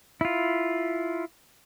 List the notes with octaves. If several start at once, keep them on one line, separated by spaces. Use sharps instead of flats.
E4 F4